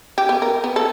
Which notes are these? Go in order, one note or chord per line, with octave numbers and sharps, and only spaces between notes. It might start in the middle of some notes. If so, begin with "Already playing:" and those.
G4
B3
A#4
B3
A4